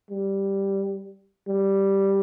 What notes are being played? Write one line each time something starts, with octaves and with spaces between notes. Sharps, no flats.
G3
G3